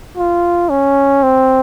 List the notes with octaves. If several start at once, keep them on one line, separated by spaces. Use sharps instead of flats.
F4
C#4
C4